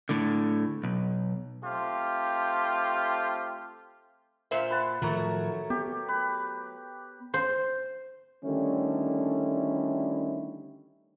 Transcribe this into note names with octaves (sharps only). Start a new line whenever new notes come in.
A2 D3
B1
A3 C4 F4 G4
A#2 C5 E5 F5
B4 F#5 A5
A2 D#3 F3 F#3 A3 A#4 C#5
B3 G4
B4
C5
D3 D#3 G3 A3 C#4 E4